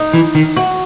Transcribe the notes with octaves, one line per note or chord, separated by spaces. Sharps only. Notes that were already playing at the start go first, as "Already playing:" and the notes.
Already playing: D#4
E3
D#3
F#4